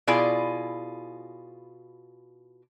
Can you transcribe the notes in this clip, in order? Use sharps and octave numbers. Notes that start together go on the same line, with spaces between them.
B2 E4 F4 G#4 D5 G#5